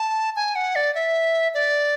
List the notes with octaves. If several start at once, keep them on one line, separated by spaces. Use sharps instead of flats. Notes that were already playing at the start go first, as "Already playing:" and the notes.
Already playing: A5
G#5
F#5
D5
E5
D5